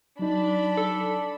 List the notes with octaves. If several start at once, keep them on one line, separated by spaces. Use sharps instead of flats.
F#3 D4 D#4 B5
A4